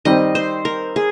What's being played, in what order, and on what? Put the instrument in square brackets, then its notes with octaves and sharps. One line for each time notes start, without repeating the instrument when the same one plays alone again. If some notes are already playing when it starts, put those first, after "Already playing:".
[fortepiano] D#3 G3 C4 [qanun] D#5
[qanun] C5
A#4
G#4